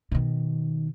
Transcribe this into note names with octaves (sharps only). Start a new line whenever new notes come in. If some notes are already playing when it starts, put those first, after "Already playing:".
B2 D#3